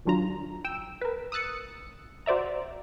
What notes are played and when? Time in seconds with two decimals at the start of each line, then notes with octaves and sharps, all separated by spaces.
0.05 G#1 D#3 F#3 D4 F4 A#5
0.65 G5 E6
1.01 A#4 B4
1.32 D#6 E6 F#6 A6 C#7
2.26 F#4 C5 D5 E5 A#5